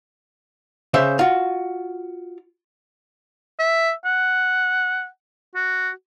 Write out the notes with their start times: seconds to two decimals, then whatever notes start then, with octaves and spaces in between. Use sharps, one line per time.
0.94 C#3 C5 E5
1.19 F4 F#4
3.59 E5
4.05 F#5
5.55 F#4